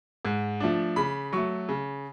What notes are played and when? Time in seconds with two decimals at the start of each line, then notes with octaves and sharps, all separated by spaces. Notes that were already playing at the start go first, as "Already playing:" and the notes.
0.25 G#2
0.60 F3 A3 D4
0.96 C#3 B5
1.32 F#3 A3 C#6
1.69 C#3